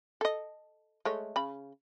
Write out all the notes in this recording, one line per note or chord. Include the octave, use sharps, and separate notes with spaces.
A4 D#5
G#3 A3 C#5
C#3 B5